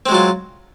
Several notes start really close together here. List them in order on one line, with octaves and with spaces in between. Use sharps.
C4 G#3 F#3 F4